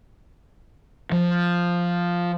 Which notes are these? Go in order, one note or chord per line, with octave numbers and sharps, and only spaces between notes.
F3